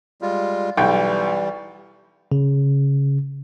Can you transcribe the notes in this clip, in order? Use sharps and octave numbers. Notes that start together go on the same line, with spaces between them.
G3 G#3 F4
B1 E3 G3 G5
C#3